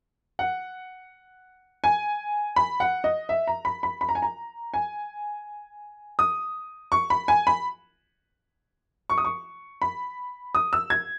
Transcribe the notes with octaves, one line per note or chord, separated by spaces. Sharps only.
F#5
G#5
B5
F#5
D#5
E5
A#5
B5
B5
B5
A#5
G#5
A#5
G#5
D#6
C#6
B5
G#5
B5
C#6
D#6
C#6
B5
D#6
E6
G#6